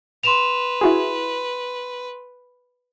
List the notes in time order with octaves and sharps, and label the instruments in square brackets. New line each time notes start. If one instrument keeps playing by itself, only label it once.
[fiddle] B4 [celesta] C6 E7 F7
[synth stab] E4 F#4 G#4